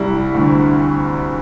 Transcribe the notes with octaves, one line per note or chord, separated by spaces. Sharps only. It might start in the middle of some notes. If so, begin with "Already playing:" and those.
Already playing: C2 G3 E4
D2